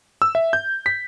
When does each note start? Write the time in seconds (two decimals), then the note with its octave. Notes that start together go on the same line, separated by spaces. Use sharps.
0.22 E6
0.35 E5
0.53 G6
0.86 B6